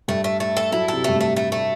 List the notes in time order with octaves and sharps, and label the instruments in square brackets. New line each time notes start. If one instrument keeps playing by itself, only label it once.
[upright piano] G2 [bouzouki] A3
[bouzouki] A3
A3
A4
[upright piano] F#3 [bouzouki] E4
[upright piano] C3 [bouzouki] A4
[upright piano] G2 [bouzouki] A3
[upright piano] A2
[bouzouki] A3
A3
A3